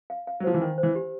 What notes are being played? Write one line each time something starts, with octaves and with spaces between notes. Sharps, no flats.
F5
F5
F#3
F3 C5
E3
D#3 D4
C5
E3
G4